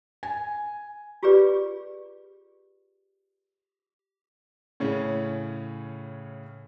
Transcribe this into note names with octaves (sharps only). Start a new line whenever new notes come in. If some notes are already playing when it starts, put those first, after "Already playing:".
G#5
F4 G4 G#4 B4 D5
A2 C#3 C#4